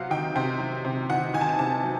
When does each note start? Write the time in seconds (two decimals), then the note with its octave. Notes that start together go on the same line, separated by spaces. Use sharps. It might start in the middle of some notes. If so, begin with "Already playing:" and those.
Already playing: C3 F#3 F5 F#5
0.11 D#3 G5
0.35 C3 G5
0.60 F#3
0.85 C3
1.10 D#3 F#5
1.34 D#3 G#5
1.41 A5
1.49 G#5
1.58 C3 A5
1.83 F#3